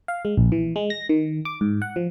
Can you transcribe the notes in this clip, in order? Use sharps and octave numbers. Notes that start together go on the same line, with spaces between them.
F5
G#3
A#1
E3
G#3
A#6
D#3
D6
G#2
F#5
F3